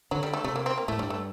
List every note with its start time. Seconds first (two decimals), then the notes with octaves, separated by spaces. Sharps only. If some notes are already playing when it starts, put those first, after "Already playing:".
0.11 D3 F#3
0.23 G3
0.33 A3
0.44 C3 A3
0.56 A#3
0.66 C4
0.78 A#3
0.88 A2 A3
0.99 G2 G3
1.10 A3